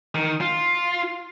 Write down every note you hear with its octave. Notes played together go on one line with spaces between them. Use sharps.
D#3
F4